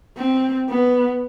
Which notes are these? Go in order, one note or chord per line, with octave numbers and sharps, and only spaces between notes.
C4
B3